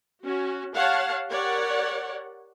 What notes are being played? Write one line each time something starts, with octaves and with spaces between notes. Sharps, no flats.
C#4 F#4
G4 C#5 F5 F#5 A5
G4 A#4 C#5 D5 F#5